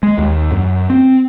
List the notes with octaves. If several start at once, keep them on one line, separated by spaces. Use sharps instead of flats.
G#3
D#2
F#2
C4